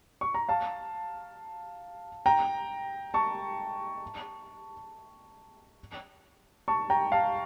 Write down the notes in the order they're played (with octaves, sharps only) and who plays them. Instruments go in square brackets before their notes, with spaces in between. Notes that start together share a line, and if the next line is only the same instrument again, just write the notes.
[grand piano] C#6
A#5
F5 A5
G5 A#5
A5 C#6
A5 C#6
G5 A#5
F5 A5